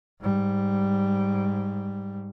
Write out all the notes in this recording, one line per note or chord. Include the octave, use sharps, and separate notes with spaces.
G#2 G3